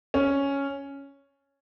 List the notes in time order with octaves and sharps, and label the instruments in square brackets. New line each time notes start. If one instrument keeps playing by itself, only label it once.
[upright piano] C#4